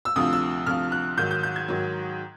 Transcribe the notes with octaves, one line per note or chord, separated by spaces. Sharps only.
E6
D2 C3 F3 D#6
E6
D2 C3 F3 F6
F#6
G#2 D#3 F#3 G6
G6
G6
G#6
G#2 D#3 F#3